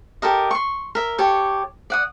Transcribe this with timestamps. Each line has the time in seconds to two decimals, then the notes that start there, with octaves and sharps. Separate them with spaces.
0.22 G4 A4 A#4 D#5
0.51 C6 C#6
0.95 A#4 E5
1.18 G4 A4 C#5
1.90 D5 F#5 D#6